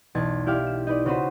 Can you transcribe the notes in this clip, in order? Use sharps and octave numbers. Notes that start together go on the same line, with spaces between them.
B1 E2 A5 G#6
E4 G4 D5 E5 F5
E7
D#4 B4 D5
C#3 C#4 F#4 B4 C5